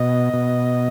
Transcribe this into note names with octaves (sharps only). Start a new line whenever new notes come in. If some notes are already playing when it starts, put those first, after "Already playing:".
Already playing: B2 D#5
B2